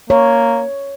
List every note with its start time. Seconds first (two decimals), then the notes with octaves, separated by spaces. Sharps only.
0.10 A#3 C#5